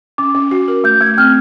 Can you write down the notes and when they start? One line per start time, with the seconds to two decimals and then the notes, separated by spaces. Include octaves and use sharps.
0.18 C#4 D6
0.35 C#4
0.51 F#4
0.68 A#4
0.84 A3 G6
1.01 A3 G#6
1.18 C4 F6